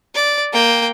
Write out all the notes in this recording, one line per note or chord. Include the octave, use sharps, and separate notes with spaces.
D5
A#3 G5